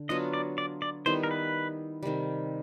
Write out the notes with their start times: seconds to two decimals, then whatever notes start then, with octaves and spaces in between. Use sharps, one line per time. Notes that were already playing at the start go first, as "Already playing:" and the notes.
Already playing: D3
0.09 F#3 B3 D4 F4 D#5
0.33 D5
0.58 D5
0.82 D5
1.06 D#3 G3 B3 E4 C5
1.23 A#4
1.31 B4
2.03 C3 D#3 G3